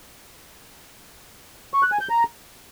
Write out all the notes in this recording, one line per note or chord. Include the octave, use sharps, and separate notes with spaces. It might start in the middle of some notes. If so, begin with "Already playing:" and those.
C#6
F#6
G#5
G6
A#5